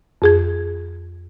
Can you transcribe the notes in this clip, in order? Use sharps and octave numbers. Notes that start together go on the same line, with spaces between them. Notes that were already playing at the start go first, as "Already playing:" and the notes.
F2 G#4 G#6